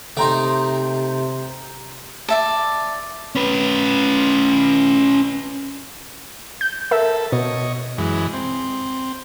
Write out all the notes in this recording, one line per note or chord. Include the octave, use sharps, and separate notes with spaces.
C3 A3 D#4 G5 A#5 C6
D5 E5 A5
C#4 B4
G6
A4 A#4 E5
B2 C#5 D#5
F#2 E3 G#3
C4